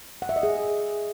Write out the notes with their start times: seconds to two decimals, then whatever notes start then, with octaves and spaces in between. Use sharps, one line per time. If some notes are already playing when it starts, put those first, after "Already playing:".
0.22 F#5
0.29 E5
0.36 D#5
0.43 G#4